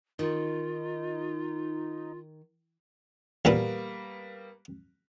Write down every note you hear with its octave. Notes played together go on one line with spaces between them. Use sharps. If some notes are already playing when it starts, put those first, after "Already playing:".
D#3 D#4 F4
E2 A#2 G3 A#3 B3 B4